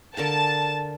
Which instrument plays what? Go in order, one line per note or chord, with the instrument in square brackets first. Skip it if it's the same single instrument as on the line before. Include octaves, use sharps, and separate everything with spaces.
[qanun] D3 A#4 F5 [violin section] A5